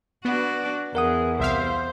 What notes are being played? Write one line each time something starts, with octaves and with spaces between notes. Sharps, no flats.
B3 D4 F#4
E2 G#4 A#4 F#5 D#6
C2 C5 E5 F5